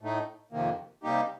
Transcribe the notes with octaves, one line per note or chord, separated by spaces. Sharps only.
A2 A3 D#4
F2 C3 D#3 A#3
C3 G3 A#3 D#4 G4